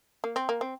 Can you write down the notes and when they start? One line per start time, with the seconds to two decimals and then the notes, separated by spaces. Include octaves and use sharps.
0.24 A#3
0.36 C4
0.49 A#3
0.61 C4